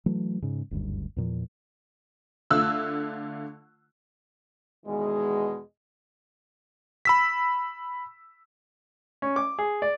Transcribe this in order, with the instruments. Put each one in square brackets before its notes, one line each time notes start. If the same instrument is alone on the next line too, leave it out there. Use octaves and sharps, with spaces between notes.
[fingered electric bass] E3 F#3 A3
G#2 C#3
F#1 D2 G2
E2 A#2 F3
[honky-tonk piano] D3 A3 F4 E6 F#6
[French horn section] E2 B2 D#3 G#3
[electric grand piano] B5 E6 B6
[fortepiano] C#4
D6
G#4
D5